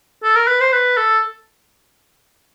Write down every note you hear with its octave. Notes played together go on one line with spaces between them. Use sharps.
A4
A#4
B4
C5
B4
A4